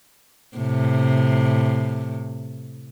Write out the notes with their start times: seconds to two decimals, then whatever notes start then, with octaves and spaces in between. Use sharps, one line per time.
0.57 A2 C3